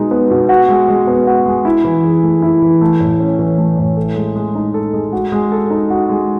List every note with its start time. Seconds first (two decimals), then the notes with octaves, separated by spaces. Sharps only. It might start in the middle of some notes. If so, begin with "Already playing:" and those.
Already playing: B2 G#3 B3 D#4
0.11 B3
0.30 B2
0.49 F#4
0.69 G#3
0.88 G#3
1.07 B3
1.27 F#4
1.46 G#3
1.65 E4
1.84 E3
2.04 G#4
2.23 A3
2.42 E4
2.62 E3
2.81 A3
3.00 A2
3.19 C#4
3.39 E3
3.58 A3
3.77 A2
3.97 A4
4.16 G#3
4.36 G#3
4.55 D#4
4.74 A4
4.94 G#3
5.13 F#4
5.32 G#3
5.52 A4
5.70 D#4
5.90 F#4
6.09 G#3